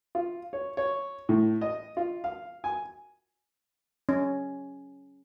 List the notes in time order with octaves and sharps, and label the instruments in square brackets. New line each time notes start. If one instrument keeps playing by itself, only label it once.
[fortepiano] F4
C#5
C#5
A2
D#5
F4
F5
G#5
[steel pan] C#4